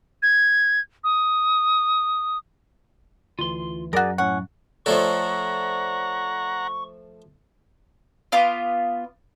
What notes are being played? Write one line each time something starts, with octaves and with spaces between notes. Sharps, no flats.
G#6
D#6
D2 E3 F4 C6
F#2 F#4 G#4 A#4 D5 G#5
A2 C#4 F#5 C#6
F3 A3 A4 C#5 D5 F#5 A#5 C#6
B3 F4 D6